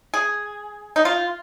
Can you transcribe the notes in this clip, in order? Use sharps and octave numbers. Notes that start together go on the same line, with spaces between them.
G#4
D#4
F4